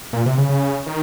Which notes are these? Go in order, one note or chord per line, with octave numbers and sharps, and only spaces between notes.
A#2
C3
C#3
C#3
D#3